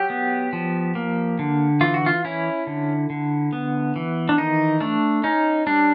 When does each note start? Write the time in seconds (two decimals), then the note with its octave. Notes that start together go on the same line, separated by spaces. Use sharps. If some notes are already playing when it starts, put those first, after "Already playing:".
Already playing: F#3 G4
0.10 B3
0.53 F3
0.95 A#3
1.39 D3
1.81 E3 F4
1.94 F#4
2.06 F4
2.25 C#4 E4
2.67 D3
3.10 D3
3.53 B3
3.96 E3
4.29 D4
4.38 D#3 D#4
4.80 A3 D4
5.24 C#4 D#4
5.67 G3 D4